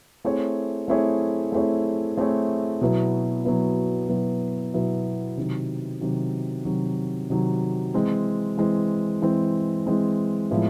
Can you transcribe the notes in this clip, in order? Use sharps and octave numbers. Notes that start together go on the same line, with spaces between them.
A3 C4 E4 G#4 C#5
A3 C4 E4 G#4 C#5
A3 C4 E4 G#4 C#5
A3 C4 E4 G#4 C#5
B2 F#3 B3 E4
B2 F#3 B3 E4
B2 F#3 B3 E4
B2 F#3 B3 E4
C3 D#3 F#3
C3 D#3 F#3
C3 D#3 F#3
C3 D#3 F#3
E3 G#3 C4
E3 G#3 C4
E3 G#3 C4
E3 G#3 C4
A2 F3 G#3 B3 E4